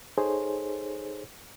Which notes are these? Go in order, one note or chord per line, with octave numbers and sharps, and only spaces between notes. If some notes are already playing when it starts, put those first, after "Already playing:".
D#4 G#4 A4 C5 C#5